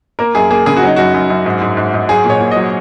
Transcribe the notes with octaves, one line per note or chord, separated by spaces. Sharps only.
A#3 A#4
F#2 G#4
A#3 G#4
C#3 G#4
F#4
F#3 D#4
F#2 F#4
F#2
F#2
G#2
G#2
G#2
G#2
F#3 G#4
A#2
C#5
A#2
F#3 D#5